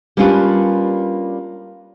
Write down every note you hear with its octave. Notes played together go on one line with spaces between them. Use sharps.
G3 A#3 C#4 D4 F4 B4